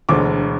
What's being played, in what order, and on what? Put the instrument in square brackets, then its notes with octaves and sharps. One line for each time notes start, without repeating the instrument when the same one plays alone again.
[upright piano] E1 D2 D3 D6